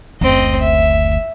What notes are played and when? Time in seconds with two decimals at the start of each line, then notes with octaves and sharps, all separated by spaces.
0.21 F#1 D2 C4 D#5
0.60 E5